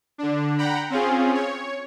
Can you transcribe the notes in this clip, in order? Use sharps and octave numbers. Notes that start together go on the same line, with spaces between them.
D3 D4
F#5 G5 A#5 B5
C4 C#4 F4 G#4
C#5